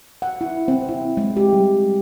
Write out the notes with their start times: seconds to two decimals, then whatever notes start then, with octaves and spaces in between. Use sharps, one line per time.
0.22 F#5
0.41 E4
0.68 C4
0.89 E4
1.17 G#3
1.37 G4
1.53 G3